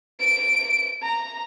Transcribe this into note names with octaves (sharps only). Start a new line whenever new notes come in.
D7
A#5